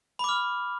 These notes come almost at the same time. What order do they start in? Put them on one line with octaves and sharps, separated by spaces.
B5 D6 F6